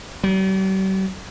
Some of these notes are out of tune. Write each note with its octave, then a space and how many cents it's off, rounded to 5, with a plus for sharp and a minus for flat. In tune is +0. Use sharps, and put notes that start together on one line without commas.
G3 -45